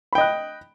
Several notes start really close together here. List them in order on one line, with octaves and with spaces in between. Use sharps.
B5 G5 D#5 F#6